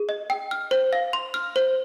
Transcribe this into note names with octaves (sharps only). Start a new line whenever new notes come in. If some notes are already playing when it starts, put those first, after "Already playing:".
Already playing: G#4
D#5
G5
F6
C5
F5
C6
F6
C5